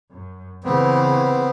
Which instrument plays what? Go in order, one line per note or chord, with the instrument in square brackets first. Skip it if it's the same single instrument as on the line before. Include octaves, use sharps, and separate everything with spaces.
[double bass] F#2
[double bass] C#3 E3 [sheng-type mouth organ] B3 C4